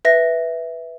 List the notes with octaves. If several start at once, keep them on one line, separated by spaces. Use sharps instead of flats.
B4 E5 A#6